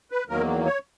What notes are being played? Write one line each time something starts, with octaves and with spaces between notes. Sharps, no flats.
B4
E2 D#3 F#3 A#3 A#4
C#5